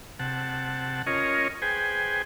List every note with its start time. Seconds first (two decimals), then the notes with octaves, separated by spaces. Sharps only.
0.19 C3 F#5 A5
1.07 C#4 F4 A#4 C#5 D#5
1.62 G#4 B4 C5 G5 G#5